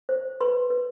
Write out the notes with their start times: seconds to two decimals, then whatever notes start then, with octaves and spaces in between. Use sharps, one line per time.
0.09 C5
0.41 B4 C6
0.70 B4